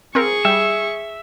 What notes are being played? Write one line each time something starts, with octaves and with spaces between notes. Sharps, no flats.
C4 F4 G#4 A#4 C#6
G3 E5